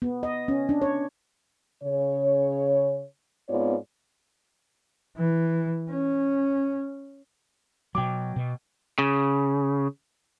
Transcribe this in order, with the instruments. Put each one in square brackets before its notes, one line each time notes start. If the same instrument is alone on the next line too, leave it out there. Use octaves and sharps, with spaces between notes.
[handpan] B3
D#5
C#4
D4
C#5
[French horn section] C#3 C#5
G#2 B3 C4 F4 C#5 D5
[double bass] E3
C#4
[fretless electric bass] B2 F#3 [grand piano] G5 D6
[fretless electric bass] B2
[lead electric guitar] C#3